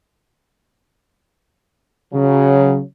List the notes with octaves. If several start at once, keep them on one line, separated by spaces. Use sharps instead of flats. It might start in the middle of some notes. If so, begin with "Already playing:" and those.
C#3 F#3